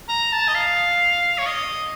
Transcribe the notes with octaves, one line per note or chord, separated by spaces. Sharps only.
A#5
A5
D#5
F5
C#5
D#5